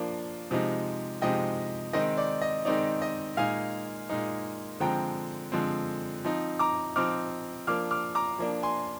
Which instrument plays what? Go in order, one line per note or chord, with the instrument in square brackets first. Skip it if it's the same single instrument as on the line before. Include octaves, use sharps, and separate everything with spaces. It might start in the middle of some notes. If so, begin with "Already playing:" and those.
Already playing: [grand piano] F3 A#3 D4
C3 F3 G#3 D#4
C3 F3 G#3 D#4 D#5 G5
D#3 G#3 C4 D#4 D#5
D5
D#5
D#3 G#3 C4 D#4 D5
D#5
A#2 G#3 D#4 F5 G#5
A#2 G#3 D#4
D3 F3 G#3 C4 G5 A#5
D3 F3 G#3 C4
F3 C4 D#4
A#5 D6
F3 C4 D#4 D6 F6
F3 A#3 D4 D6 F6
D6 F6
A#5 D6
F3 A#3 D4
G#5 C6